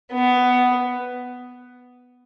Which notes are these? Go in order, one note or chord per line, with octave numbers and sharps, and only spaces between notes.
B3